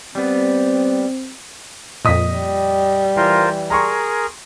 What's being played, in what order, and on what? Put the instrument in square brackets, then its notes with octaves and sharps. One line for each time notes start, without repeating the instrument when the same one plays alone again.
[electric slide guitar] G3 B3 [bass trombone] C4
[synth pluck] F2 A#2 [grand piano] D#5 D#6 B6
[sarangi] G3
[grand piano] E3 [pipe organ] F4 A#4 C5
[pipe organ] G#4 A#4 [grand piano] A#5 C6 C#6